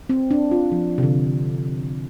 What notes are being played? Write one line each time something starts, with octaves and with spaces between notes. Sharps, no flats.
C4
D4
F4
F3
C3
D3